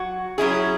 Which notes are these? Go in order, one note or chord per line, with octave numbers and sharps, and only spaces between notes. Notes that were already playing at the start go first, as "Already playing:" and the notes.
Already playing: F#3 F#4
F#3 C#4 E4 G#4